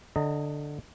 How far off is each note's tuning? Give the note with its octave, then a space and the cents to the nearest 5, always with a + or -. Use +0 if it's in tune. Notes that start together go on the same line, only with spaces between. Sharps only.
D3 +0 D#5 +0 A#5 -40